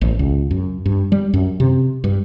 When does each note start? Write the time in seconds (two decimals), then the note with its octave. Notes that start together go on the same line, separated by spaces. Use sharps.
0.01 A1
0.19 C#2
0.51 F#2
0.86 G2
1.12 G3
1.34 F#2
1.60 C3
2.04 G2